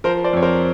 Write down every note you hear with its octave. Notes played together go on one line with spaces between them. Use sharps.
F3 A#4 C5
C5 D5
F2 C#5
A#4 C5